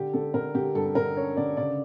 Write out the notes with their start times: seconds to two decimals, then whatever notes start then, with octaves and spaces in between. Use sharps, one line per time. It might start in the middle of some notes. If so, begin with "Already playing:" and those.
Already playing: D3 G4
0.13 D3 A4
0.34 D3 A#4
0.54 D3 G4
0.75 G2 A4
0.95 D3 A#4
1.16 C#4 C#5
1.37 D3 D5
1.57 C#3 D5